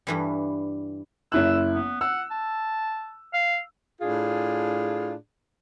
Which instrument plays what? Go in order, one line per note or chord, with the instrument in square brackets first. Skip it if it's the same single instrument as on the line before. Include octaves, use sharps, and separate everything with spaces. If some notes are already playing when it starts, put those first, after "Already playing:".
[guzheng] G2 E3 G3
[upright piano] F#1 E4 F#6 [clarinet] E6
[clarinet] B3
[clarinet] F#5 [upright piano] E6
[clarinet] A5
F5
[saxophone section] A2 D4 F4 G#4